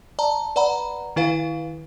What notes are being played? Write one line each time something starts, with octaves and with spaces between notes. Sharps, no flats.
D5 A5 A#5
B4 D5 F#5 A#5 B5
D#3 E4 B4 F5